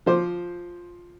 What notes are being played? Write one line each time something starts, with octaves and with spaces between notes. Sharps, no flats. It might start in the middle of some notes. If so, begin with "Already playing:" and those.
F3 C5 D6